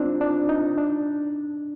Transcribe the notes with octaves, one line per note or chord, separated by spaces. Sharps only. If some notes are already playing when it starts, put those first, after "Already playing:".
Already playing: C4 D4 D#4 F4
D4
D#4
D4